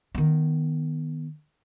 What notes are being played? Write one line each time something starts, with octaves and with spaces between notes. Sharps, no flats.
D#3 B3